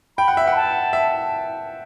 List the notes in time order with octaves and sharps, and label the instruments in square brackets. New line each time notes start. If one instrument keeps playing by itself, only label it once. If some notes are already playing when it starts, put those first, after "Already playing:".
[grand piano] G5 [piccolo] B5
[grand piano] F#5
E5
[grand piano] F#5 [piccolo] B5
[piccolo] A5
[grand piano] E5